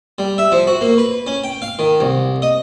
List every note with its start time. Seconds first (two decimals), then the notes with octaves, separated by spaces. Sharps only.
0.18 G3
0.38 E5
0.52 F3
0.67 F#4
0.81 A#3
0.98 B4
1.27 C#4
1.44 G5
1.62 F5
1.79 D#3
2.00 C2
2.42 D#5